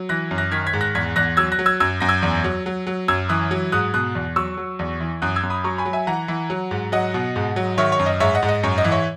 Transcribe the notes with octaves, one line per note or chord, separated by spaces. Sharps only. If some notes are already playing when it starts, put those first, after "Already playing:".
Already playing: F#3
E3 F#6 A#6
F#2
F#6 A#6
D#3 G#6 B6
G#6 B6
G#2
F#6 A#6
E2 G#6 B6
E2 F#6 A#6
F#3 E6 G#6
F#6 A#6
F#3
E6 G#6
F#2 E6 G#6
F#2 A#6
E6 G#6
E2
F#3
F#3
F#3
F#2 E6 G#6
E3 D#6 F#6
F#3
G#2 D#6 F#6
B2 D#6 F#6
E2
F#3 C#6 E6
F#3
E2
E3
F#2 D#6 F#6
E6 G#6
F#2
B5 D#6
F#3 A#5 C#6
G#5 B5
F#3
E5 G#5
E3 F#5 A#5
E3
F#3
G#2
F#3 D#5 F#5
B2
G#2
F#3
D#3 C#5 E5
C#5
F#2
D#5
G#2 C#5 E5
D#5 F#5
G#2
D#5
F#2 C#5
D#5
E3
C#5 E5